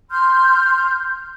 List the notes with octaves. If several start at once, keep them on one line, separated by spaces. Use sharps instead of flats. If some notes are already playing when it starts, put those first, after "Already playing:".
C6 F6 G6